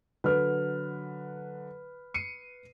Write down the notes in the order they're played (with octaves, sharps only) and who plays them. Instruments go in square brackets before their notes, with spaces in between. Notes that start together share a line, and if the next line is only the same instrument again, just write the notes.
[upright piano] D3 F#3 [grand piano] B4 F6
[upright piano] C7 C#7 D#7